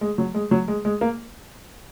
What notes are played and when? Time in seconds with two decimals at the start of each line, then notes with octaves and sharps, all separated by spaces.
0.01 G#3
0.18 F#3
0.34 G#3
0.51 F#3
0.68 G#3
0.85 G#3
1.01 A#3